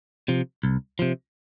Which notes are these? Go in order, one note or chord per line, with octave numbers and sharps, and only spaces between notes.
C3 F3
C2
C3 F3